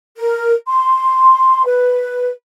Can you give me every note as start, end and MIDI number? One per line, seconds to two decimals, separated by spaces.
0.16 0.53 70
0.67 1.63 84
1.66 2.29 71